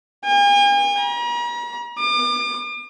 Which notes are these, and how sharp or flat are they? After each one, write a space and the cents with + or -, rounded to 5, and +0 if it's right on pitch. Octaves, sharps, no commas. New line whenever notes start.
G#5 -45
A#5 +45
D6 +40